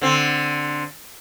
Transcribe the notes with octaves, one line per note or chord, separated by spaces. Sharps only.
D3 C4